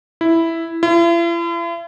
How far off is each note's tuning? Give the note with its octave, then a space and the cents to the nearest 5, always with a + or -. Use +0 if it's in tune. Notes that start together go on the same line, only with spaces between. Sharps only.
E4 +0
E4 +45